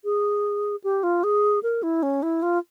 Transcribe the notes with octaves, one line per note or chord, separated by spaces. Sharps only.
G#4
G4
F4
G#4
A#4
E4
C#4
E4
F4